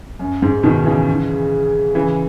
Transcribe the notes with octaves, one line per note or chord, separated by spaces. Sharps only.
F#2
G#2
B2 D#3
C#3 E3
C#3 E3